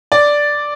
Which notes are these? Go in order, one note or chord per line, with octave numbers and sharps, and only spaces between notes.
D5